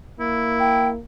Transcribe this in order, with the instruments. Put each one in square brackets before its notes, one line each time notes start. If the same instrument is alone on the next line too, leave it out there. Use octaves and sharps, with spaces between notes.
[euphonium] A#3 [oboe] E4
[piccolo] G5